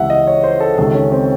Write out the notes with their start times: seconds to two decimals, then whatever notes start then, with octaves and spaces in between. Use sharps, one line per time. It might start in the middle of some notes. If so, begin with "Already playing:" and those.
Already playing: C#2 C3 E3 E5 F#5
0.10 D#5
0.27 C#5
0.44 C5
0.60 A4
0.77 C#2 C3 D#3 A4
0.94 C#4
1.12 C4